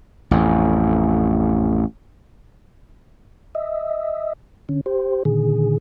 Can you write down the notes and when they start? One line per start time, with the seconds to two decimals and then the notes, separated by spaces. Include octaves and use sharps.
0.31 A1 F2
3.55 D#5 E5
4.69 D3 C#4
4.86 G4 C5
5.25 A#2 D3 D#3 G#4